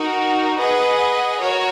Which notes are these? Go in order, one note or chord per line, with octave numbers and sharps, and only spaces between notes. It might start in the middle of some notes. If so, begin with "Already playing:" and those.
Already playing: D#4 F#4 A#4
G#4 B4 D#5 F#5
F#4 A#4 C#5